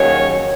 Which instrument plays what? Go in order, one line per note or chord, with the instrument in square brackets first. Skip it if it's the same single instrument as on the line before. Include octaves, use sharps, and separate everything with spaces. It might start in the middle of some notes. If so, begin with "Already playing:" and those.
Already playing: [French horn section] D#2 C#3 F#3 C#5